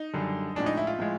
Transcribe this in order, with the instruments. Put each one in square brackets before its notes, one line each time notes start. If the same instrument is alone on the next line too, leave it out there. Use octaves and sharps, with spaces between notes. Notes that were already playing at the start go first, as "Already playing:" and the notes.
Already playing: [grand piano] D#4
F#2 D3 G3
A2 F3 G#3 D4
D#4
E4
F4
A2 F3 G#3